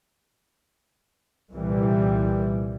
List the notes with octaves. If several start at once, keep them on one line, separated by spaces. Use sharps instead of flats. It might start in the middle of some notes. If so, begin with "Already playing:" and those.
C2 A#2 E3 G3